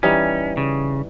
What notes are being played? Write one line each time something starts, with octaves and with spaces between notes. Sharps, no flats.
E3 G3 C#4 D#4
C#3